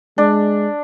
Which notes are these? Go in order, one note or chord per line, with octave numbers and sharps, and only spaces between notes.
G#3 D4